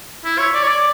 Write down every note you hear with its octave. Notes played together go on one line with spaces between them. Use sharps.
E4
C#5
D5
C#5
D5